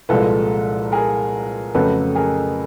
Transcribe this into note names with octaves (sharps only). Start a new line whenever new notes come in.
C2 A#2 F3 G#3 A4 B4
G#4 A#4
F2 C#3 F#3 A3 A4 B4
G#4 A#4